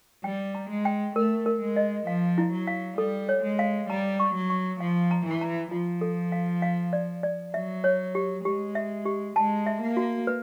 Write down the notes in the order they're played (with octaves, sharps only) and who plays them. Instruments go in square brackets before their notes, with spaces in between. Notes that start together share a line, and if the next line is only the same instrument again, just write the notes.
[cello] G3 [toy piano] G5
[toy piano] A#5
[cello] G#3
[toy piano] G5
[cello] A3 [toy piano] A#4
[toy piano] A#4
[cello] G#3
[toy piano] D#5
[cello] F3 [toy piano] F5
[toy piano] E4
[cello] F#3
[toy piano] F5
[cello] G3 [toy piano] A4
[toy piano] C#5
[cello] G#3
[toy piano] F5
[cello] G3 [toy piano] A#5
[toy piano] C#6
[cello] F#3
[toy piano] C#6
[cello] F3 [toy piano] F5
[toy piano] A#5
[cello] E3
[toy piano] A#5
[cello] F3 [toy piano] F4
[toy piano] A4
F5
F5
D5
D5
[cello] F#3 [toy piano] E5
[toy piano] C#5
G4
[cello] G#3 [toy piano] G4
[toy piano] E5
G4
[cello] G#3 [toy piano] A5
[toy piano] E5
[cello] A#3
[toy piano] F#4
B4